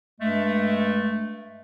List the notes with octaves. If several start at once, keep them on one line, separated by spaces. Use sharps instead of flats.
G2 G#3 A3